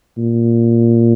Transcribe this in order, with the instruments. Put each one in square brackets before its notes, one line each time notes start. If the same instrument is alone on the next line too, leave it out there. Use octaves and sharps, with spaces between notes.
[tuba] A#2